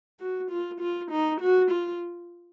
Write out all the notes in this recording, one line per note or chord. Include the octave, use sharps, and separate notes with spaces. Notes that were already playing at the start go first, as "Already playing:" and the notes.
F#4
F4
F4
D#4
F#4
F4